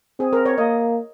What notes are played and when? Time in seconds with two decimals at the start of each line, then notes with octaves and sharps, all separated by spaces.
0.19 C4 G#4
0.33 A#4
0.46 C#5
0.58 A#3 D#5